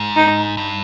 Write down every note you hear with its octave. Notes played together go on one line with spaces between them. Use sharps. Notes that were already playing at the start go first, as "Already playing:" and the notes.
Already playing: G#2
D#4
G2